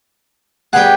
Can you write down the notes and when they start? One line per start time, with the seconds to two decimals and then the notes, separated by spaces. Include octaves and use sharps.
0.73 G3 B3 G#4 F#5 G5